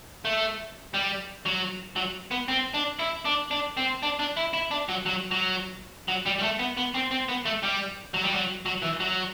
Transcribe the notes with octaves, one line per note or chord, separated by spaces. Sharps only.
A3
G3
F#3
F#3
B3
C4
D4
E4
D4
D4
C4
D4
D4
E4
E4
D4
F#3
F#3
F#3
F#3
G3
G3
A3
B3
B3
C4
C4
B3
A3
G3
F#3
G3
F#3
F#3
E3
F#3